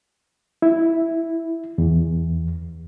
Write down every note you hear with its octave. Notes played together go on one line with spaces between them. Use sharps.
E4
E2